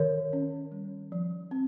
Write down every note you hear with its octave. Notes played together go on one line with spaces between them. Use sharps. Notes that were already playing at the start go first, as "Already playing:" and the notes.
Already playing: D#3 A#4 C#5
C#4
G3
F3
C4